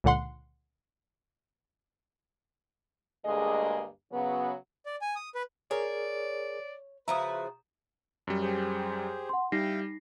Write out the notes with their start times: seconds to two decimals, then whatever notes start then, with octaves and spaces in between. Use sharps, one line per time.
0.04 C#2 A#2 D3 F#5 C6
3.25 D2 G2 G#3 A#3 G#4 D#5
4.12 C#3 F#3 B3
4.86 D5
5.01 G#5
5.16 D#6
5.35 B4
5.71 G#4 A#4 C#5 D5
7.08 C#3 F3 F#4 B4 E5 A#5 D#6
8.27 F#2 G3
8.41 G4 G#4 C5
9.29 F#5 C6
9.52 G3 D#4 E4 F5 G5 A#6 C7